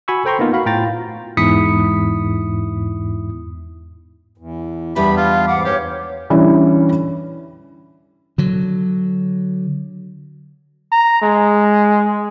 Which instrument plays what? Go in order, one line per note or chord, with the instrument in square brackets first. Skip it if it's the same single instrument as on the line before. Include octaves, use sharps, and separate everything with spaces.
[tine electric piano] F#4 G#5 B5 C#6 E6
A4 C5 G5 A#5 C6 C#6
A#3 B3 D#4 F4 A#4
F#4 F5 B5
A2 F4 G5 A#5 A6
E2 G#2 E4 D#6 B6 C#7
[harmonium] E2
[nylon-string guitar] E2 G3 B4 [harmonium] B3 D4 G4 [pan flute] E5 [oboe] B5
[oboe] F4 [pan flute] F5
[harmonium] G#2 F5 [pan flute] F#5 [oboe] D6
[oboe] G4 [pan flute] C#5
[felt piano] D3 E3 G3 C#4
[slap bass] D3 F#3
[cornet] A#5
G#3